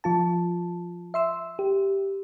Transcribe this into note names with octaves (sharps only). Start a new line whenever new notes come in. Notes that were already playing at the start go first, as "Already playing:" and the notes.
F3 F4 A5
E5 C6 E6
G4